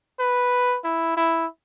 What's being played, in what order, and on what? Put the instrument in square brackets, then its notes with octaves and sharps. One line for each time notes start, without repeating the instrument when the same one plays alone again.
[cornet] B4
E4
E4